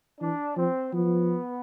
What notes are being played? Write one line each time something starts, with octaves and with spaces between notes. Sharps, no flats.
E3 D4
F3 C4
F3 B3